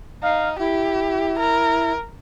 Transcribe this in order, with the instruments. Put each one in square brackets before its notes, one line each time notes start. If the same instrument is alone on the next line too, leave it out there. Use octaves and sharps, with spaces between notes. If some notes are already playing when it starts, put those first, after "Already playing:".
[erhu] D#4 [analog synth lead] F5
[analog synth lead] E4 [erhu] G4
[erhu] A#4